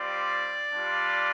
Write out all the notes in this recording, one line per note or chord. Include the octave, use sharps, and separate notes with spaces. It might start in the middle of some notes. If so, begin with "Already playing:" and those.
Already playing: G3 C4 F4 D5
G3 D4 F4